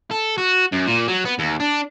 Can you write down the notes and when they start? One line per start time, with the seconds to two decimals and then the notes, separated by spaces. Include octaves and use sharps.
0.11 A4
0.38 F#4
0.72 F#2
0.87 A#2
1.08 F#3
1.25 B3
1.39 D#2
1.60 D4